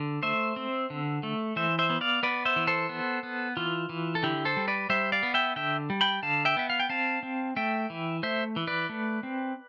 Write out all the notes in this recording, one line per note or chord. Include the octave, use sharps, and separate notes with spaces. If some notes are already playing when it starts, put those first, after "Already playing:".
Already playing: D3
A3 C5 E5
C4
D3
A3
E3 C5 E5
C5 E5
B3
D5 F5
B3 B4 D5
C5 E5
E3
A4 C5
B3
B3
E3 F4
E3
A4
D3 E4 G4
A4 C5
G3
B4 D5
G3 C5 E5
D5 F5
B3
E5 G5
D3 E5 G5
G3
G5 B5
D3 F5 A5
E5 G5
B3 E5
F5
G5
C4 F5 A5
C4
A3 E5 G5
E3
A3 C5 E5
E3
B4 D5
A3
C4